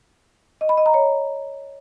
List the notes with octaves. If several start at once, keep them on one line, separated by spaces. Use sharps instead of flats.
D#5
B5
D#5
A#5
C#5